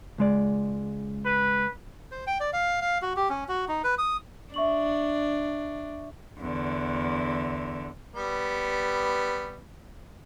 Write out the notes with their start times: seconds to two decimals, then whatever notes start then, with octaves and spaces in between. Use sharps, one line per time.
0.18 C#2 G#3 D5
1.26 B4
2.11 C5
2.27 G5
2.40 D5
2.53 F5
2.81 F5
3.02 F#4
3.17 G4
3.29 C#4
3.49 F#4
3.68 D#4
3.84 B4
3.98 D#6
4.54 D4 E5 C#6 F#7
6.39 E2 D3
8.15 G3 B3